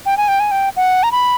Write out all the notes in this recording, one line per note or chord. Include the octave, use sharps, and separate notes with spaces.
G5
G#5
G5
G#5
G5
F#5
A#5
B5